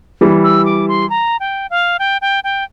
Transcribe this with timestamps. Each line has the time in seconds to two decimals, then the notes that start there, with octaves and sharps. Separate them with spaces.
0.21 E3 G3
0.44 E6
0.66 D6
0.88 C6
1.10 A#5
1.40 G5
1.70 F5
1.99 G5
2.21 G5
2.44 G5